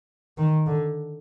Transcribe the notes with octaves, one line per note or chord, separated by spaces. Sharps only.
D#3
D3